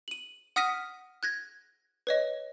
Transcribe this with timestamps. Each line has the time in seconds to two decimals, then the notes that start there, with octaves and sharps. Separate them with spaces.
0.08 D#7 F#7
0.56 F#5 D#6 F6 A#6 B6 D#7
1.23 F#6 G#6 A#6
2.07 B4 C#5 D#5